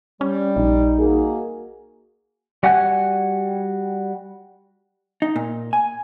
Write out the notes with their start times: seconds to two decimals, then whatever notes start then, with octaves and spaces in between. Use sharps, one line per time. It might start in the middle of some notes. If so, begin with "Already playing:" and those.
0.21 G3 C#4
0.56 A#1 D#4
0.99 A#3 F#4 G#4
2.63 G3 F#4 F#5 G#5 F#6
5.22 D#4
5.36 A#2
5.73 G#5